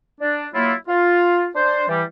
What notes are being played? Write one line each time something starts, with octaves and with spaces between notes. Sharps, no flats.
D4
F#3 A#3 E4 F4
F4
D4 C5
E3 G3